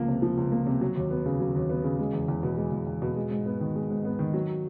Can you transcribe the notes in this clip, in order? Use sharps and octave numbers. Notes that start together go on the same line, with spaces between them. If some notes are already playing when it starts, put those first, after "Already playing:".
Already playing: C#2 F3 A#3
C3
F3
C#2
A#3
C3
F#3
D#2
B3
C#3
F#3
D#2
B3
C#3
G#3
E2
E2
B2
G#3
E2
E2
B2
G#3
G#2
B3
D#3
G#3
G#2
B3
D#3
F#3